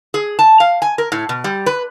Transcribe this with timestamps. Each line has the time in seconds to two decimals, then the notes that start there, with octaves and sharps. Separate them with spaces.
0.14 G#4
0.39 A5
0.60 F5
0.82 G#5
0.98 A#4
1.12 A2
1.29 B2
1.44 G3
1.66 B4